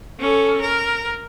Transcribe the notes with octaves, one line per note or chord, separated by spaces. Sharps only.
C#4 A4
A#4